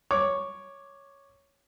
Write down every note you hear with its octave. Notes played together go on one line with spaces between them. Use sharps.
C#5 D6